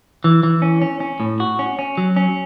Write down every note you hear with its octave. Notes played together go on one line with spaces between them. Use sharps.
E3
E3
C#4
C#4
C#4
A2
F#4
C#4
C#4
F#3
C#4